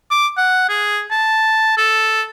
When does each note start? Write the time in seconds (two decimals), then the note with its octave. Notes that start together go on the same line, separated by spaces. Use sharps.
0.11 D6
0.37 F#5
0.69 G#4
1.11 A5
1.77 A4